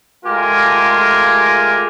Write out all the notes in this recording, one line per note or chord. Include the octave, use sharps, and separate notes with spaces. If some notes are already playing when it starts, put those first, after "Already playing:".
G#3 A3 F4 G4 A#4 G#5